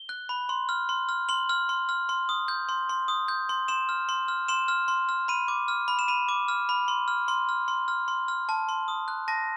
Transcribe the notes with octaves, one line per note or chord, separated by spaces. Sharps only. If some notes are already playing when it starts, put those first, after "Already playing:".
Already playing: G7
F#6
B5
C6
F6
C6
F6
C6 F#7
F6
C6
F6
C6
D#6
G6
C6
C6
D#6
G6
C6
C6 E7
F6
C6
F6
C6 E7
F6
C6
F6
B5 D#7
D6
F6
B5
E7
B5 D#7
D6
F6
B5
C6
F6
C6
F6
C6
F6
C6
F6
A5
C6
D#6
F#6
A5 A#6